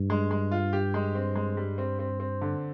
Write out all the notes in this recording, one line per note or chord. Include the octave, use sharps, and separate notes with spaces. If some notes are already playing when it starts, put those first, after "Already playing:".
Already playing: G2
G#3
G#3
F4
G4
G#3
C4
G#3
G3
C4
C4
C4
D3